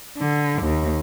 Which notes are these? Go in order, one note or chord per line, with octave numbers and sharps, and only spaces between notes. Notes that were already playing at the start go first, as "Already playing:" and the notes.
D3
D#2